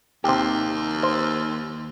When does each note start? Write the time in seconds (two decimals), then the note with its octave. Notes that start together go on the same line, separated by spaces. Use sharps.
0.24 D#2 C3 G4
1.03 C5